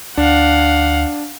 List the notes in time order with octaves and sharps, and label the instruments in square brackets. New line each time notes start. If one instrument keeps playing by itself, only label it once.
[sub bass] D2 [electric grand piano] D4 [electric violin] F5 F#5